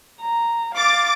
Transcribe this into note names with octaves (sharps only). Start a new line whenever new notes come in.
A#5
F5 D6 A6